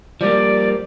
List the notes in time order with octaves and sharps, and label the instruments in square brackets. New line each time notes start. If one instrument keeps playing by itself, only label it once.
[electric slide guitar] F3 G3 A#3 [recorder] D5